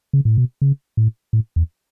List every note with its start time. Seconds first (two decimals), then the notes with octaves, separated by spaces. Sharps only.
0.13 C#3
0.25 A2
0.38 B2
0.62 C#3
0.97 A2
1.33 A2
1.56 E2